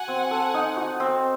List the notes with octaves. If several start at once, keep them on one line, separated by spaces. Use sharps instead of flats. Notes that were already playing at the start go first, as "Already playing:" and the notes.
Already playing: F#4 F#5 G#5
C4
A4
D#4
F#4
C4